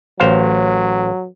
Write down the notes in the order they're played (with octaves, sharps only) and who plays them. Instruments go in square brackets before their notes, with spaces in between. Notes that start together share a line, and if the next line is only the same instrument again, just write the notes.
[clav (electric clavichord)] A1 C5 F5 [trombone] F#3